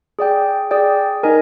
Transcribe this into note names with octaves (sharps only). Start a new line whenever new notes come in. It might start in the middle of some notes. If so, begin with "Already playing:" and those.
G#4 D5 G5
G#4 D5 G5
D#4 A#4 D#5 G#5